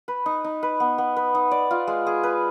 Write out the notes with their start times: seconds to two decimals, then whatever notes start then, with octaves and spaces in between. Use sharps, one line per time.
0.08 B4
0.26 D#4
0.44 D#4
0.63 B4
0.80 B3
0.98 B3
1.16 B4
1.35 D#4
1.51 D5
1.71 F4
1.87 G#3
2.07 G#4
2.23 B4